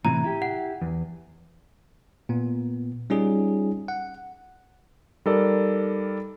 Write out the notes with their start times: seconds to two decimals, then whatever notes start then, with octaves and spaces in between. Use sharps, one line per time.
0.05 A2 C3 E3 A#5
0.24 E4 G4
0.42 F#5
0.81 E2
2.29 A#2 B3
3.10 G3 C#4 D#4 F4 G#4
3.88 F#5
5.26 G3 D#4 A4 A#4 D5